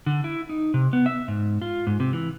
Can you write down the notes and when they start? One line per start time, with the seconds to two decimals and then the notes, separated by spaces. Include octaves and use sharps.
0.06 D3
0.24 E4
0.49 D#4
0.74 C3
0.93 B3
1.06 E5
1.28 G#2
1.62 F4
1.87 G#2
2.00 C3
2.13 E3